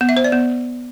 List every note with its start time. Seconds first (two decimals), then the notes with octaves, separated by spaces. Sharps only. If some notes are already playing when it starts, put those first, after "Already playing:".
0.01 B3
0.09 E5
0.17 C5
0.24 D5
0.32 B3